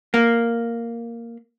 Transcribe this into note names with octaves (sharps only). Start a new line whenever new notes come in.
A#3